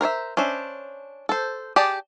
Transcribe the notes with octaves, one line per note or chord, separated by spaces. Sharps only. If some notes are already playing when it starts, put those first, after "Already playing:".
A#4 C5 C#5 E5
C#4 D4 C5 E5
A4 C5
G4 G#4 D5 A5